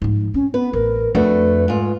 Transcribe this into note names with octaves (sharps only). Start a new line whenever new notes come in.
G#2 F3
C4 C#4
B3 B4
A1 A#4
F2 A3 D4 F#4 B4
G#2 F4